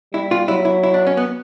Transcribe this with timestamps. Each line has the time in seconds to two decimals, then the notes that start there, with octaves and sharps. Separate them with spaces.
0.14 G3 E4
0.31 F4
0.48 F#3 E4
0.65 E4
0.83 E4
0.94 D4
1.07 C#4
1.17 B3